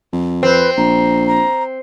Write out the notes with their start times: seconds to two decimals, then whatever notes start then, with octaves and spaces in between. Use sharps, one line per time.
0.13 F2
0.43 C4 B4
0.77 A#1 A#5
1.27 A#5